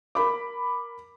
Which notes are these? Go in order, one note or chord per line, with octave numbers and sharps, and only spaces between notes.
A#4 B5 D6